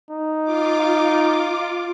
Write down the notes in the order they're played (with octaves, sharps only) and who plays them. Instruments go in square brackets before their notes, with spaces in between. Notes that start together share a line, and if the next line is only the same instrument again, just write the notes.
[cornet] D#4
[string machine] F4 D6